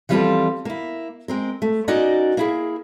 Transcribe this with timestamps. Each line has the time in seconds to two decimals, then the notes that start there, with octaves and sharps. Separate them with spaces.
0.09 E3 F3 G3 C4 F4 A4
0.65 A#3 E4
1.28 G#3 C4 A#4
1.62 A3
1.88 C#4 D#4 F#4 A#4 D5 D#5
2.37 A#3 E4 G#4